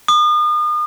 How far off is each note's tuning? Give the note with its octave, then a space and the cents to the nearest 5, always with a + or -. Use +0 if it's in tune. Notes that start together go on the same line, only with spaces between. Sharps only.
D#6 -40